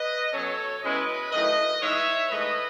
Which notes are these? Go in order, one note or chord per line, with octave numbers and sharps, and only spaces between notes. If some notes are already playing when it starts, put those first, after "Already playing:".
Already playing: B4 D#5
B2 F#3 C#4 A4 C#5
B2 G#3 C#4 E4 B4 D#5
F#2 D#3 A3 E4 B4 D#5
E3 G#3 D#4 C#5 E5
G#2 E3 A3 B4 D#5